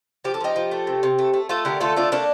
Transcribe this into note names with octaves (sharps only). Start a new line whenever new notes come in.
F3 G4
A4
F3 D#4 G4
F3
A3
C3
C3
A3
A3
A3 F4 A4
D3 G4 A#4
A3 F4 A4
A3 D4 F4
A3 A#3 D4